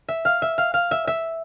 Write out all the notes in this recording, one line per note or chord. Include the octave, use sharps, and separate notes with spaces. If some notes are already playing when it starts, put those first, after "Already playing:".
E5
F5
E5
F5
F5
E5
E5